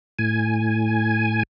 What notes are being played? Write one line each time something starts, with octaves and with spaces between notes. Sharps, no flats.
A2 G#5